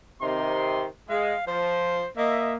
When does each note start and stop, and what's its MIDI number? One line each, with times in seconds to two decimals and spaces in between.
0.22 0.85 48
0.22 0.85 51
0.22 0.85 84
1.09 1.34 56
1.09 1.44 77
1.47 2.02 53
1.47 2.08 72
2.17 2.57 58
2.17 2.53 75
2.17 2.53 76